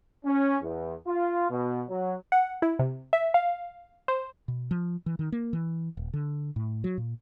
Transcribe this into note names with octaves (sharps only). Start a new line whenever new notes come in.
C#4
E2
F4
B2
F#3
F#5
E4
C3
E5
F5
C5
B2
F3
E3
D#3
A#3
E3
D#1
D3
A2
F#3
A#2